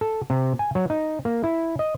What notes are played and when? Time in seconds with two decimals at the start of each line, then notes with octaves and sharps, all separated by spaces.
0.01 A4
0.30 C3
0.59 G#5
0.75 F#3
0.90 D#4
1.25 A#3
1.44 E4
1.79 D#5